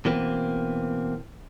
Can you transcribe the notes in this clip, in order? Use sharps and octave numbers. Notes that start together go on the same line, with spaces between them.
B2 E3 A#3 C4